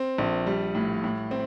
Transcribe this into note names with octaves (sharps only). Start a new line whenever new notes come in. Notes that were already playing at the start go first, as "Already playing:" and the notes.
Already playing: C4
A#1
G3
A2
A2
C4